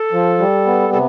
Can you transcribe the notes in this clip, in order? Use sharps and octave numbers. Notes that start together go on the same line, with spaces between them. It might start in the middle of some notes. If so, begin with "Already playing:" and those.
Already playing: A4
F3
G3
B3
C3 A4